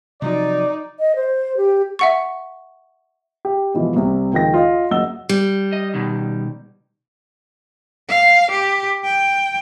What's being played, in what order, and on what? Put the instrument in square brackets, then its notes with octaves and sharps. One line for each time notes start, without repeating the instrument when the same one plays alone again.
[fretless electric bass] C3 F3 F#3 [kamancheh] D#4 [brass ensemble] D5
[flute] D#5
C5
G4
[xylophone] E5 F#5 C#6
[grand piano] G4
B2 E3 F3 G#3
C2 C3
C#2 D#3 F3 G5 A#6
F4 D#5
F#1 F#2 D#5 F#5 E6 G7
[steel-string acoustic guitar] G3
[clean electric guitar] D#5
B2 D#3
[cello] F5
G4
G5